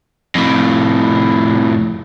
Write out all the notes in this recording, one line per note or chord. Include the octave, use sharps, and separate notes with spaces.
F2 A2